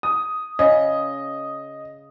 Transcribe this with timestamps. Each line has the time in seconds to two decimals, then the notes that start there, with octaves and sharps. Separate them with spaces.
0.03 D#6
0.59 C#3 D#5